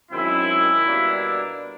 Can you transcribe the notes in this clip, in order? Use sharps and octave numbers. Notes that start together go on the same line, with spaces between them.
F#2 D#3 G#3 C4 E4
B2 G3 A#3 D4